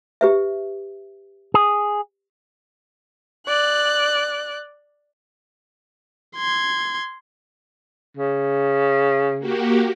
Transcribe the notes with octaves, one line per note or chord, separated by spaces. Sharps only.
G4 B4 E5
G#4
D5 F#6
C6 G#6
C#3
A#3 F#4 G4